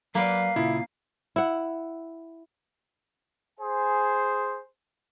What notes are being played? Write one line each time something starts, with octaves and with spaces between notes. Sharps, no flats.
F#3 A#3 B4 D5 F5
A#2 C#3 E4 F4
E4 F#5
G#4 C5 G#5